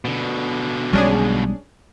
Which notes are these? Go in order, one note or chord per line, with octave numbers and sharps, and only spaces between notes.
B2 D3
B1 G3 G#3 C#4 D4 G#4